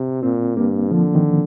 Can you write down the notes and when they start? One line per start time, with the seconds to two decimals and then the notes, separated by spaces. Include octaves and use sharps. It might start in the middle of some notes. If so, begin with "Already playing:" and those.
Already playing: C3
0.22 A#2 C4
0.57 G2 A#3
0.91 D3 F3
1.15 D#3